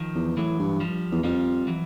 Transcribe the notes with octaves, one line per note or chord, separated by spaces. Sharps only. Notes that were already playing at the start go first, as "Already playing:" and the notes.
Already playing: D#3 F3
E2
A2 E3 F#3
G2
F3 G3
E2
F2 F3 G3
E3 F#3